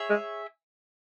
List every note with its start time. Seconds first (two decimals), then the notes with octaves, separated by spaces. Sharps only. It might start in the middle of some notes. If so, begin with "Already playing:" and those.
Already playing: G#4 C#5 E5
0.10 G#3